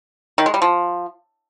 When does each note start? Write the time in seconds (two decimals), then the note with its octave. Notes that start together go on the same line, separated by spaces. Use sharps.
0.38 D#3
0.46 G#3
0.54 G3
0.62 F3